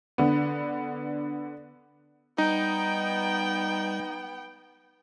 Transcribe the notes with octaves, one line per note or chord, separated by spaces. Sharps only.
D3 B3
G3 B3 D#4 G5